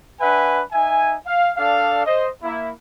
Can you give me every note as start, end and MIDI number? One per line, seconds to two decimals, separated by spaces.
0.20 0.61 62
0.20 0.61 71
0.20 0.61 76
0.20 0.61 78
0.20 0.61 80
0.72 1.14 63
0.72 1.14 76
0.72 1.14 80
1.26 1.51 77
1.57 2.04 62
1.57 2.04 69
1.57 2.04 74
1.57 2.04 77
2.05 2.29 72
2.05 2.29 75
2.43 2.71 58
2.43 2.71 64